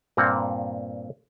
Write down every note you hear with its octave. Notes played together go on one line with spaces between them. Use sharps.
G2 A#2 A#3 C4 F#5